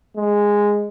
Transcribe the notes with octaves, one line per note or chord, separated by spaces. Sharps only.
G#3